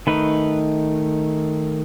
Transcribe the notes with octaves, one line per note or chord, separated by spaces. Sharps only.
D#3 A3 D#4 B4